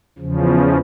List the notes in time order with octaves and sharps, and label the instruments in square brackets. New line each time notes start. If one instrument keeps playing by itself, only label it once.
[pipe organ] E2 C#3 F3